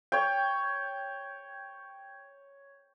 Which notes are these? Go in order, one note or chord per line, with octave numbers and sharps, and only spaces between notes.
C#5 G5